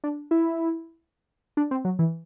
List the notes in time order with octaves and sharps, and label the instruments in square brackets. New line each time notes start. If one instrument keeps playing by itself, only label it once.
[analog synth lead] D4
E4
D4
C4
F#3
E3